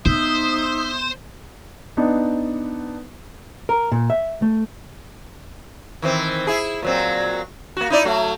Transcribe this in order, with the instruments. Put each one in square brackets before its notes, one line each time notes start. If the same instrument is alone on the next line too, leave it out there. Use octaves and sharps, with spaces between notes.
[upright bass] B3 [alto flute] D#4 [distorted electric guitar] C5 [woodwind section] E5 D#6
[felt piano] B3 D4 D#4
[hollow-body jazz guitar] A#4
A#2
E5
A3
[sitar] D#3 E3 C4
E4 G#4
A#2 F#3 C4
A#3 F#4
D#4 E4 D5
F#3 A3 F#4